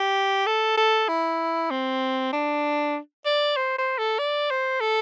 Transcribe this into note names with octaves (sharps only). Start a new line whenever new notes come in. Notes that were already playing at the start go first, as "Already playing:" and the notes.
Already playing: G4
A4
A4
E4
C4
D4
D5
C5
C5
A4
D5
C5
A4